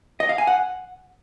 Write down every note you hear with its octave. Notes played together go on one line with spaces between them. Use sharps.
D#5
F5
G#5
F#5